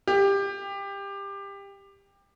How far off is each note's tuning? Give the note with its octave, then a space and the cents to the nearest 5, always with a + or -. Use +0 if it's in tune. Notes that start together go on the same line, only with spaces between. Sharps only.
G4 +20